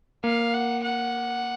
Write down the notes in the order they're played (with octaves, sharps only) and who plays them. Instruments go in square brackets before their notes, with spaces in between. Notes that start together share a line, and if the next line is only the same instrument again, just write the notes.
[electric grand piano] A#3 [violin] F5
[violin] F#5
F#5